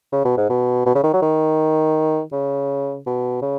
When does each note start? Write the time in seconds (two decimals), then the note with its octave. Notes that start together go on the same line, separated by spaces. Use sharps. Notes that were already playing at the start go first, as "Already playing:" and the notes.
0.12 C#3
0.25 B2
0.37 G#2
0.50 B2
0.86 B2
0.95 C#3
1.03 D#3
1.13 F#3
1.22 D#3
2.32 C#3
3.06 B2
3.42 C#3